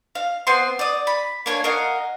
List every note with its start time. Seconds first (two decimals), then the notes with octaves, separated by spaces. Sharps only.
0.15 F5
0.47 B3 C4 C6
0.79 D5 D#6
1.07 B5
1.46 A#3 D4 C#5 G#5
1.64 A#4 D#5 F5 F#5